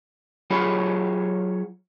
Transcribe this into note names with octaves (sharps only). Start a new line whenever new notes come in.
F#3 F4 G#4 C#5 B5